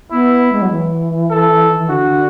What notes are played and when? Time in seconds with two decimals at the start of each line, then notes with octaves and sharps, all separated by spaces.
0.12 B3 E4
0.52 G#3
0.62 F#3
0.71 E3
1.30 A4
1.79 E3
1.89 D3 F#4